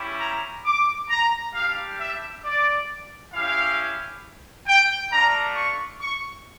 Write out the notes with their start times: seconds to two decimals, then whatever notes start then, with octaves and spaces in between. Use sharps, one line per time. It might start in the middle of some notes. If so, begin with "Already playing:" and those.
Already playing: G3 C#4 E4 G4
0.20 A#5
0.65 D6
1.10 A#5
1.54 G3 D4 G4 F5
1.99 E5
2.44 D5
3.32 C#4 E4 G4 F5
4.66 G5
5.10 A3 D4 F4 A#5
5.55 C#6
6.00 C#6